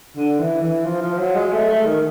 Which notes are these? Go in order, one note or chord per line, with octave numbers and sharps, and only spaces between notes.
D3
E3
E3
F3
F3
F#3
G#3
A3
A3
D#3